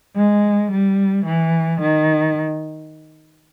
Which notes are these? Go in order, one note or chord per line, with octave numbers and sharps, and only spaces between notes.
G#3
G3
E3
D#3